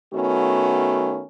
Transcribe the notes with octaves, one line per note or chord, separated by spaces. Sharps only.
D#3 A3 B3 C#4 F#4